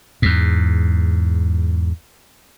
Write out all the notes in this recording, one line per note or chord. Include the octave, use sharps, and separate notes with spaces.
E2 G#2